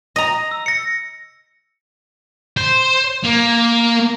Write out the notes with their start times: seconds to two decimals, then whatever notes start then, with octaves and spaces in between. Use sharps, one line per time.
0.16 D#5 A#5
0.51 E6
0.66 A#6 C#7
2.57 C5
3.25 A#3